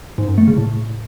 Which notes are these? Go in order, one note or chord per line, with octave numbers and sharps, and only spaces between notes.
G#2
F#2
A3
C#3
A2